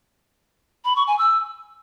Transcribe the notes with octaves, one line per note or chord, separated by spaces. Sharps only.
B5
C#6
G#5
E6